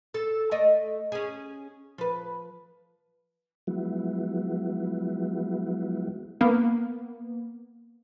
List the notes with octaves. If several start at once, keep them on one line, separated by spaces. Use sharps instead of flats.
A4
A3 D5 D#5
C#4 G#4
F3 B4
F3 F#3 G#3 B3 E4 F#4
A#3 B3